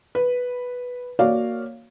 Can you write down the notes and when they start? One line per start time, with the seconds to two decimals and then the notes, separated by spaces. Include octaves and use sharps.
0.15 B4
1.19 A#3 F#4 C#5 D5 F5